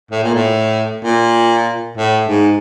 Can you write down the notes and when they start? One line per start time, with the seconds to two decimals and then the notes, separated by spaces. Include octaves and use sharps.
0.11 A2
0.23 A#2
0.35 A2
1.05 A#2
1.97 A2
2.28 G#2